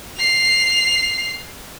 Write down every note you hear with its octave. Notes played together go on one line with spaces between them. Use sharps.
C7 F7